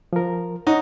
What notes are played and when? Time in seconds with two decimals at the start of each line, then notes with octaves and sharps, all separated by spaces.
0.13 F3 A#4
0.67 D#4 C#5 F#5 A#5